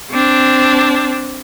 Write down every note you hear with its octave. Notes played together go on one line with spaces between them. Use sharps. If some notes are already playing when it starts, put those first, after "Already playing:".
C4 D4